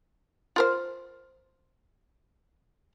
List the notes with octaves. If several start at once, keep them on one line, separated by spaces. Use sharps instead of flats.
F4 A#4 C5